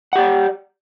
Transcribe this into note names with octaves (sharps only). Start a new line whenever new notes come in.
G4 D5 F#5